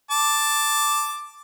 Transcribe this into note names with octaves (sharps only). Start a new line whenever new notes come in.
A5 D6